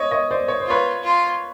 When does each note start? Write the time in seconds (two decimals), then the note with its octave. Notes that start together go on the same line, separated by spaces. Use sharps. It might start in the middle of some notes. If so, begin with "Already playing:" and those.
Already playing: C#5 D#5
0.11 C#5 D#5
0.31 C5 D5
0.48 C#5
0.60 C5
0.66 F4 B4 C#5
1.03 F4